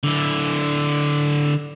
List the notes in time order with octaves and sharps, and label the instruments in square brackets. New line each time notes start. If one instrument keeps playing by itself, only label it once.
[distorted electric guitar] D3 E4